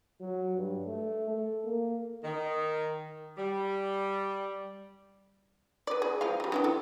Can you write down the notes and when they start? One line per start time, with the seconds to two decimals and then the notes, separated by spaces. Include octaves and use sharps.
0.21 F#3
0.57 G2
0.87 A3
1.30 A4
1.65 A#3
2.24 D#3
3.37 G3
5.87 B4 D5
6.02 G#4
6.21 F3 G#3 F5
6.40 F#3 G3
6.52 E3 D4 G5
6.64 A4